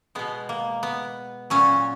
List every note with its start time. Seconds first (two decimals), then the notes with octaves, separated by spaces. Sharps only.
0.15 B2 G#3 B3
0.49 A#3
0.83 B3
1.50 A#2 F#3 C#4